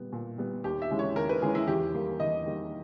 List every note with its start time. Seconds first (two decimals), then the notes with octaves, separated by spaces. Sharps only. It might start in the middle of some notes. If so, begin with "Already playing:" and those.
Already playing: A#2 G3 B3
0.12 A#2
0.38 G3 B3
0.64 D#2 G4
0.82 E5
0.90 C#3 E3 G#3 C#4
0.99 C#5
1.16 D#2 A#4
1.29 B4
1.42 C#3 E3 G#3 C#4 G#4
1.55 E4
1.67 E2 G4
1.94 D#3 G3 A#3
2.20 E2 D#5
2.46 D#3 G3 A#3